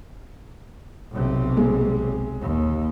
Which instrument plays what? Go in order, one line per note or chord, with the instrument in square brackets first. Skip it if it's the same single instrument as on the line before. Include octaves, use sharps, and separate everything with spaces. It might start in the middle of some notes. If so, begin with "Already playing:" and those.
[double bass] B1 C3
[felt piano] G#3
[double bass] D#2